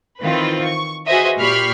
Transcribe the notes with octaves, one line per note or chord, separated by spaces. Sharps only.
D#3 E3 C4 F4 B4
C#6
F#4 G#4 B4 C5 D#5 E5
A#2 G4 B5 C#6 F6 C7